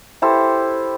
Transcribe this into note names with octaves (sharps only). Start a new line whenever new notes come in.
E4 G4 A4 C5